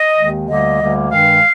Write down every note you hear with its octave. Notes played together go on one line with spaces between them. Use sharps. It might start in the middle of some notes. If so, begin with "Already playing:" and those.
Already playing: D#5
D#2 D#3 G#3
D2 D3 G3 A#3 D#5
D2 D3 G3 A#3
G2 D#3 G#3 F5